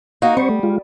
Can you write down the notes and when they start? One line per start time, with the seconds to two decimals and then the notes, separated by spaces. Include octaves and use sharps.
0.22 A#3 D#4 F#4
0.37 G3 C4 C5 C#6
0.50 A3
0.63 G#3 F4